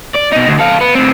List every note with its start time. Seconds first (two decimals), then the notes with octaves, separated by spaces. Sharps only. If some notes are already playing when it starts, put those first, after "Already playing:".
0.15 D5
0.32 B2 D#4
0.48 D2
0.59 A4 F5
0.81 B3
0.95 A2 C4